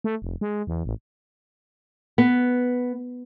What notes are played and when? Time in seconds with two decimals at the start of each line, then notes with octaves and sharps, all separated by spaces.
0.04 A3
0.22 F1
0.41 G#3
0.67 E2
0.85 A1
2.18 B3